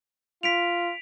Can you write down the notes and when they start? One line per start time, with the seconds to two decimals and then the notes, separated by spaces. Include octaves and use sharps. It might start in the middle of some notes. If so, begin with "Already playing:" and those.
0.43 F4 B6 D7 F7